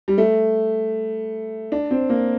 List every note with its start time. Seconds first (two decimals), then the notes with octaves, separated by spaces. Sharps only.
0.08 G3
0.18 A3
1.72 D4
1.91 C4
2.10 A#3